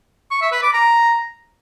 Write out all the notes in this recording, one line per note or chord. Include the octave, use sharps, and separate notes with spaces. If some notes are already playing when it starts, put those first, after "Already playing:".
C#6
E5
B4
D6
A#5